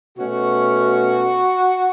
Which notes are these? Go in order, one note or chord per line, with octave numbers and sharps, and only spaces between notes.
B2 A3 C#4 F#4